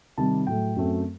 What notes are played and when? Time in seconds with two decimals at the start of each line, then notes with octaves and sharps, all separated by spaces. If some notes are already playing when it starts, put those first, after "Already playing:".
0.18 C3 D#3 G3 A5
0.47 A2 F#3 A3 G5
0.76 F#2 F#3 A3 C4